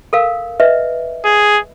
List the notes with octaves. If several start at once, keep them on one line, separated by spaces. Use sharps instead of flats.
A4 A#4 F5
B4 D#5 E5
G#4